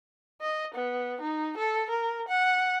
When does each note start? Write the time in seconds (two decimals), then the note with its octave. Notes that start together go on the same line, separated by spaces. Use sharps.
0.41 D#5
0.74 B3
1.21 D#4
1.57 A4
1.90 A#4
2.28 F#5